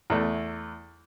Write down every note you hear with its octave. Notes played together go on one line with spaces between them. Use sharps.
E2 A3